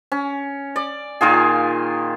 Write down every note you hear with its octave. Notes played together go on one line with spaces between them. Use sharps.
C#4
D5
A#2 D#3 F4 G#4